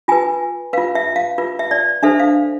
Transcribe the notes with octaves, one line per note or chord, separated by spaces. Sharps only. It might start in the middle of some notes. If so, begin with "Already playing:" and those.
F4 B4 G#5
F4 B4 F5
E5
F5
F4 B4
E5
D5
D4 A4 C5 E5
F5